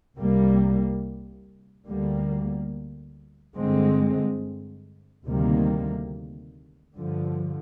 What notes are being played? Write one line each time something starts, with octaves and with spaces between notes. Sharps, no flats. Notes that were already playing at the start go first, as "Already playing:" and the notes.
C2 C3 G3 A#3
D2 D3 G3 A#3
G2 D3 G#3 C4
D2 C3 D#3 G3 A#3
G2 D3 F3